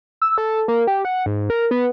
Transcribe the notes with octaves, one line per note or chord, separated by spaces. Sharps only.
E6
A4
A#3
G4
F#5
G#2
A#4
B3